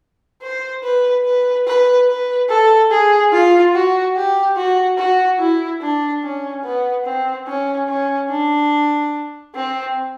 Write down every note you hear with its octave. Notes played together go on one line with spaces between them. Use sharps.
C5
B4
B4
B4
B4
A4
G#4
F4
F#4
G4
F#4
F#4
E4
D4
C#4
B3
C4
C#4
C#4
D4
C4